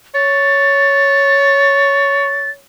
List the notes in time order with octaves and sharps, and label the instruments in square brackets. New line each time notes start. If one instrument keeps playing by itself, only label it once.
[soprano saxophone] C#5 [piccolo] A6